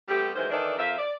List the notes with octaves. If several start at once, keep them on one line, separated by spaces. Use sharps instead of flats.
G3 A3 B3 C4 G4
D#3 E3 F#3 G#3 C5
D#3 E3 D4 A4 D5 D#5
F2 F4 A#4 C5 E5
D5